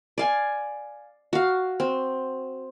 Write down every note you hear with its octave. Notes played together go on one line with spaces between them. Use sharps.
D5 F5 G#5
F#4 F5
C4